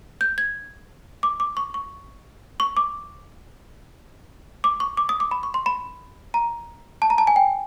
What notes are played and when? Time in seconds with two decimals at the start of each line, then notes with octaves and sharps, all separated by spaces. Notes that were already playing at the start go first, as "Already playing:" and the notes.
0.21 G6
0.38 G#6
1.23 D6
1.40 D6
1.57 C#6
1.74 C#6
2.60 C#6
2.77 D6
4.64 D6
4.80 C#6
4.97 D6
5.09 D#6
5.20 D6
5.31 B5
5.43 C#6
5.54 C6
5.66 B5
6.34 A#5
7.02 A5
7.10 A#5
7.18 A5
7.27 G#5
7.36 G5